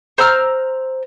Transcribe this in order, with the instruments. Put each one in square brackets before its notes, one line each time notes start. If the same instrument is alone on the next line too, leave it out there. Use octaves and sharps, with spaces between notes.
[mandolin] C5 A#5 E6 F6